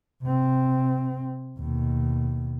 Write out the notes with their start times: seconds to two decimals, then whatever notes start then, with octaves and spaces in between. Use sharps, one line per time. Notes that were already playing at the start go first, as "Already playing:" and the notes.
0.22 C3 C4
1.58 D#2 B2